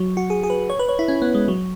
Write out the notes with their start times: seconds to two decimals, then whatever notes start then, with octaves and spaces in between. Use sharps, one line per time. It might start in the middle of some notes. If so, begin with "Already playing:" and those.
Already playing: F#3
0.17 F#4
0.30 G#4
0.43 G#4
0.50 B4
0.70 C#5
0.79 B4
0.89 C#5
0.99 E4
1.08 C#4
1.22 B3
1.35 G#3
1.48 F#3